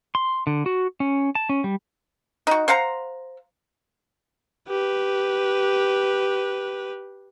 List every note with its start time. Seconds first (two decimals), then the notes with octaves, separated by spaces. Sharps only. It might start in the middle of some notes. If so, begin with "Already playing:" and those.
0.15 C6
0.47 D3
0.66 F#4
1.00 C#4
1.35 A5
1.49 C#4
1.64 G3
2.47 D#4 F#4
2.68 C5 F5 F#5 A#5
4.68 G4 B4